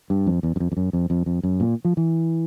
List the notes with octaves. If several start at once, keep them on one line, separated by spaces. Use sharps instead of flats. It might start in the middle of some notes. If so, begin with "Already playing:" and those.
G2
F2
E2
F#2
F2
F2
F#2
F2
F2
F2
F#2
A#2
F3
E3